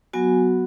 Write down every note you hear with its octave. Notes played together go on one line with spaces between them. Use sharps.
F#3 B3 F#4 G#5